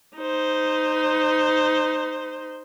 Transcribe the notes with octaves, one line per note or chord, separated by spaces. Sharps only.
D#4 C5